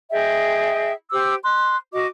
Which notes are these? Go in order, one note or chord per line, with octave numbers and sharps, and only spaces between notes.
G#4 D#5 E5 G5
G4 C5 D6 E6
C6 F#6
F#4 D#5 D6